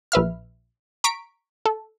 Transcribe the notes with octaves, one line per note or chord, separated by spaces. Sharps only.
A#1 B4 E5 F6
A#5 C#6 B6 D7
A4